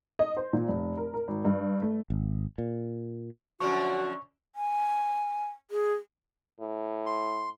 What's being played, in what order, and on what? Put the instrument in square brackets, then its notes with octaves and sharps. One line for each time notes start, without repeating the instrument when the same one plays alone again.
[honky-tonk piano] D#5
C5
A#2
F1
A#4
A#4
G#1
G2
A3
[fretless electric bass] G#1
A#2
[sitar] F#2 D3 F3 [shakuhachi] F#4 [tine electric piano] C#6
[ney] G#5
G#4
[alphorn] A2
[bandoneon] C6